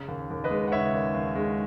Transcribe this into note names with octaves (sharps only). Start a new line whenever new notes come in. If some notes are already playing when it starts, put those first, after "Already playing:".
Already playing: C#3
D#2
D#2
B4 D#5
G#3
F#5
C#3 C#5 E5
D#2
D#2
G#3